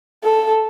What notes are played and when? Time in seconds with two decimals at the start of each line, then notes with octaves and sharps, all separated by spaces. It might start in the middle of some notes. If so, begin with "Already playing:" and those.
0.24 A4